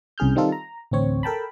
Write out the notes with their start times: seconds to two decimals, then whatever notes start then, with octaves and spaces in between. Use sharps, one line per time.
0.18 C2 C#3 G#4 F6 G6
0.35 D#3 G3 C4 D#4 F4 A4
0.52 A#5
0.91 A1 D2 C4 C#5
1.23 A4 A#4 G5 A5 B5